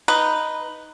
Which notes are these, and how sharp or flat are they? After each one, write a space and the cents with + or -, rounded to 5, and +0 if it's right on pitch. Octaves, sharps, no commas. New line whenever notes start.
D#4 +0 B4 +0